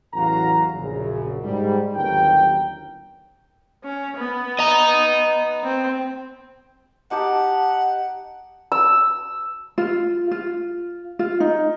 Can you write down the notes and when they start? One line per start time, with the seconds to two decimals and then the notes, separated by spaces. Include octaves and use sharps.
0.14 A1 E2 F#3 F#4 F5 A#5
0.73 A#1 F#2 C#3
1.43 G#2 G3
1.95 G1 D#2 F#3 C#4 A#4 G5
3.84 C#4
4.17 B3
4.59 D#5 A#5
5.64 C4
7.11 D#4 G4 F#5 A5
8.72 E6
9.78 F4
10.31 F4
11.19 F4
11.40 D#4